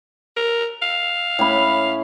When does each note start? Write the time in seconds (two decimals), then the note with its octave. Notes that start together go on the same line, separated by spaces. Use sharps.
0.36 A#4
0.82 F5
1.39 A2 C#4 B5